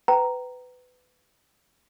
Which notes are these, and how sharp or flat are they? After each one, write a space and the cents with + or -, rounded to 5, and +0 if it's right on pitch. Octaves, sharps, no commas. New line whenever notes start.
B4 +20 G5 -35 A#5 +0